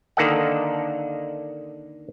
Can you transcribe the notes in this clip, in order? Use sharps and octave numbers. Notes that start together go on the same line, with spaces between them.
D3 D#3 A#3 A4 D#5 F#5